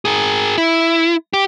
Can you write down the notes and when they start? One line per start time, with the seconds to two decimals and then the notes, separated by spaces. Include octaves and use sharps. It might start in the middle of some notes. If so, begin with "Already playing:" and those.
0.05 G#4 A#4
0.58 E4
1.33 G4